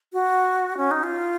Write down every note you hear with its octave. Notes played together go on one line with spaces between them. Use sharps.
F#4
C#4
D#4
F4